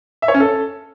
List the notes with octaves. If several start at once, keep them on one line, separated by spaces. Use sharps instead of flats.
E5
C#5
C#4
A4